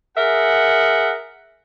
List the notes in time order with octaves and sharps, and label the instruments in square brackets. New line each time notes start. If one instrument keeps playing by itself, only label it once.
[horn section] G#4 A#4 E5 F#5